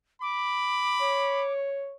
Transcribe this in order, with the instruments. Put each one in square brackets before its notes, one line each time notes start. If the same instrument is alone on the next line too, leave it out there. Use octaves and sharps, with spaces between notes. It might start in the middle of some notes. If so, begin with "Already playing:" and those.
[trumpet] B5 [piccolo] D6
[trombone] C#5